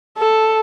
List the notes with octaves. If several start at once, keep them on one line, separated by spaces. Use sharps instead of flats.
A4